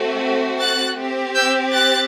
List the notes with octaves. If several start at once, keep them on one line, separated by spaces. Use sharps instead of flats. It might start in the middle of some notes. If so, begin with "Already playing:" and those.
Already playing: A3 C4 F#4
F#6 A6
C4 G4
E6 G6
F#6 A6